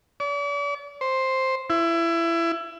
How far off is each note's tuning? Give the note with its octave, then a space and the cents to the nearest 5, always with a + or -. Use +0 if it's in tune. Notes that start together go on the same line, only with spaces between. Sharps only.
D5 -40
C5 +5
E4 +25